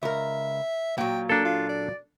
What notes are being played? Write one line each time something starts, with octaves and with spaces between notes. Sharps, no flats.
C#2 A#4 E5
A#2 F#3 G5
A#3 D4 A4
F4
D5